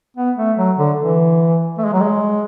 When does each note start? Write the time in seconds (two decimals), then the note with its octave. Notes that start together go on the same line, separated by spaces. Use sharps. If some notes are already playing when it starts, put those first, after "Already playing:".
0.17 B3
0.37 A3
0.57 F#3
0.77 D3
0.98 E3
1.78 A3
1.86 G#3
1.93 F#3
2.01 G#3